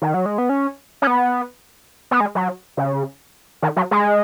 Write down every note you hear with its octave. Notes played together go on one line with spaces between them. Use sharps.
D#3
F#3
G#3
B3
C#4
C#4
B3
B3
G#3
F#3
C#3
D#3
F#3
G#3